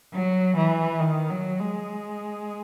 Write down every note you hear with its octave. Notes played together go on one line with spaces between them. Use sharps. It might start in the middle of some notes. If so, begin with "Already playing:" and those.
F#3
E3
D#3
F#3
G#3